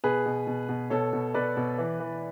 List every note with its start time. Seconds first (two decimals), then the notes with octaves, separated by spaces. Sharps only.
0.04 B2 G#4 B4
0.26 B2
0.47 B2
0.69 B2
0.90 B2 A4 C#5
1.13 B2
1.34 B2 B4 D5
1.57 B2
1.78 E3
2.00 E3